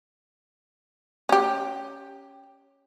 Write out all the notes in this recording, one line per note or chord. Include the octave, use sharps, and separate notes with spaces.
C#4 G4